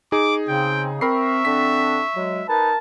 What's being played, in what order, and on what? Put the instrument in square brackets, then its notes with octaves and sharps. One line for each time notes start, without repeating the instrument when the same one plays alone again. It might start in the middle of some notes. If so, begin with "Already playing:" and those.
[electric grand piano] D#4 G#4 [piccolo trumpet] D6
[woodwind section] C#3 [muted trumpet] C4 [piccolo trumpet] G5
[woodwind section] C4 [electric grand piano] A#4 B5 C7 [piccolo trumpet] E5 [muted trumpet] C#6
[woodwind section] D3 C4 D4 [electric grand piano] B6
[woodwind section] F#3 G#3
[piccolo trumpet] D#4 [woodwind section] A#4 A5 [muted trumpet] B4